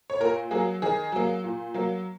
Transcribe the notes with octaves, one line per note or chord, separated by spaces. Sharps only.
C#5
A#2 A#4
F#3 A#3 G#4
D#3 G#4
F#3 A#3
A#2
F#3 A#3